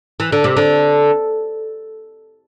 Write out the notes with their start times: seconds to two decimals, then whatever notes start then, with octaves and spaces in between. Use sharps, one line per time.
0.20 E3
0.32 D3
0.44 C3
0.57 D3